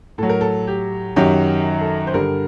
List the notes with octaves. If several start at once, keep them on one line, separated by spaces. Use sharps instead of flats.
A2 F#3 A4
A#4
A4
G4
F#2 D#3 F#3 G4
A4
C5
G2 D3 G3 A#4